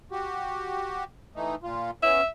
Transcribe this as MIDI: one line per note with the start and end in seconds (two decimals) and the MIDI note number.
0.12 1.04 66
0.12 1.04 67
1.35 1.55 52
1.35 1.55 57
1.35 1.55 63
1.63 1.91 46
1.63 1.91 65
2.03 2.21 59
2.03 2.21 61
2.03 2.26 76